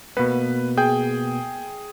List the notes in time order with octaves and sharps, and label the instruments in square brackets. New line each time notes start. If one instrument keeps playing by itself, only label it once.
[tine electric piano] B2 A#3 B3 [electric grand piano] B4
[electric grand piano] G#4 G5 G6